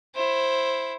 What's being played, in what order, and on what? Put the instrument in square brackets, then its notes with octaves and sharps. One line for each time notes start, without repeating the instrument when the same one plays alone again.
[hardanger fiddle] E4 C5